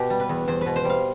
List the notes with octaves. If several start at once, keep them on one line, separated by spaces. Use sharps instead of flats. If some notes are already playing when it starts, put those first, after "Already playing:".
Already playing: B2 G4
G3
B4
E2
E2 C5
B2 B4
C5
G3 F5